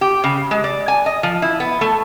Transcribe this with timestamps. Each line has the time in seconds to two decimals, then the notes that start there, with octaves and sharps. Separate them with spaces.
0.01 G4
0.24 C#3
0.51 G#3
0.64 D5
0.88 G#5
1.06 D#5
1.23 F3
1.42 E4
1.60 B3
1.81 A3